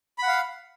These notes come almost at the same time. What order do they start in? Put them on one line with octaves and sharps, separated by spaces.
B5 F#5 F5